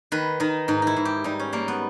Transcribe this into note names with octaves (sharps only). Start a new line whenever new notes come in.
D#3 B4
D#3 D#4
G#2 D#4
D#4 E4
G#2
G4
G3 D#4
C#4
G3 A#3
B3